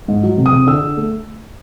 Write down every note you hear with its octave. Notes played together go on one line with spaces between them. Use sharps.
G#2
F#3
C3
D#6
C3
D3 E6
D3
A3